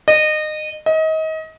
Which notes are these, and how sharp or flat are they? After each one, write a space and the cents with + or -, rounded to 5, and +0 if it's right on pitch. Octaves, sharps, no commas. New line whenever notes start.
D#5 -25
D#5 +30